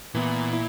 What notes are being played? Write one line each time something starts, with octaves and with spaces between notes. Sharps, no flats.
A#2 E3 B3 E4
E4